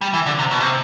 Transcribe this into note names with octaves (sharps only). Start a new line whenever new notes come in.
G3
E3
D3
C3
B2
C3